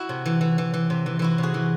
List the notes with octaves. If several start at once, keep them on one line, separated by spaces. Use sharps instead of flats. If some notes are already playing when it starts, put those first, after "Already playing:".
Already playing: E4 F#4
C3
E3
E3
E3
E3
C3
E3
E3 E4 F#4
C3
F#4 G#4
E3